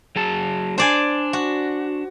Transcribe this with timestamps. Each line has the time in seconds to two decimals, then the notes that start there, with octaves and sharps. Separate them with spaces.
0.16 F#3 G#4 A5
0.78 D4 C5 D5 G#5
1.33 F#4